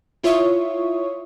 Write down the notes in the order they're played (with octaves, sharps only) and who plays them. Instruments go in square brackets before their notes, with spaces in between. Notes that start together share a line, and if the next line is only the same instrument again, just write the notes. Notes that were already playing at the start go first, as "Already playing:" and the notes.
[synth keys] E4 F4 C#5 E5 C#6 D#6